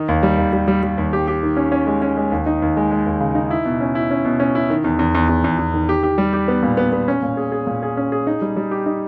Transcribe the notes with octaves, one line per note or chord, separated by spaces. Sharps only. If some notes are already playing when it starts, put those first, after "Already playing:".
Already playing: D#3 D#4
D#2
G3
D#2
G3
G3
G3
D#2
G4
G4
D#3
C#4
C#4
G#3
C#4
G#3
D#2
D#4
D#2
G#3
G#3
D#2
C#3
D#4
E4
B2
C#4
E4
C#4
B2
C#4
E4
D#3
E2
E2
E2
E2
E2
E2
D#3
G4
G4
G3
G4
B3
A#2
B3
B3
C#4
A#2
G#4
G#4
A#2
G#4
C#4
G#4
D#4
G3
G3
G4
D#4